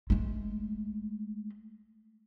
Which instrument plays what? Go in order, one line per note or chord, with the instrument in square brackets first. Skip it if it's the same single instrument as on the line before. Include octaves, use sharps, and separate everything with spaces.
[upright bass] G#3 A3